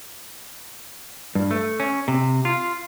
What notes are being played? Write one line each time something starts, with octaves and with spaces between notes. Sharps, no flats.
G2
A3
C#4
C3
F4